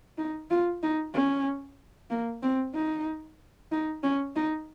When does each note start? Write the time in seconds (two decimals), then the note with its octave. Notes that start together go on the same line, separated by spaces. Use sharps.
0.18 D#4
0.50 F4
0.83 D#4
1.14 C#4
2.10 A#3
2.43 C4
2.75 D#4
3.72 D#4
4.03 C#4
4.36 D#4